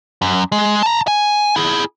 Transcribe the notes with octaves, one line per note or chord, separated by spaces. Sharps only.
F#2
G#3
A5 A#5
G#5
E4 G#4